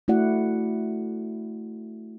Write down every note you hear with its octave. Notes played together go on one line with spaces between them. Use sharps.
A3 E4 F#4 D5 F#5